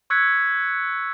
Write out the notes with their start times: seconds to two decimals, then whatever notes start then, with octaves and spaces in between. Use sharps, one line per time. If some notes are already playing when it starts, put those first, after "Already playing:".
0.10 C#6 E6 F#6 G#6 B6 C#7